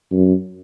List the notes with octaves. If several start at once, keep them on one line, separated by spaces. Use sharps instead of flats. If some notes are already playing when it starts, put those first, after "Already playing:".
F#2